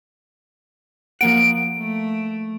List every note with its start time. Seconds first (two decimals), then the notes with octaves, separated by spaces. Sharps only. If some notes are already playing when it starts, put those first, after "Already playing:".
1.21 F3 A#3 F#5 D7
1.78 A3